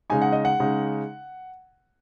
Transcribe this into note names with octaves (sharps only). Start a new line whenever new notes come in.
C#3 G#3 D#4 G#5
F#5
D#5
F#5
C#3 G#3 D#4